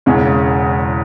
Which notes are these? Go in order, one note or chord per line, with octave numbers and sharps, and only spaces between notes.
E1 E2 C#3 G#3